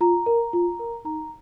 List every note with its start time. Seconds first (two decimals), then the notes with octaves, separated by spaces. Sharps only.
0.01 F4 A#5
0.26 A#4
0.53 F4
0.79 A#4
1.05 D#4 A#5